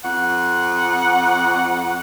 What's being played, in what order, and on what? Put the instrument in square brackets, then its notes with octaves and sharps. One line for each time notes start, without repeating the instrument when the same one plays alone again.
[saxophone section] F2 F#5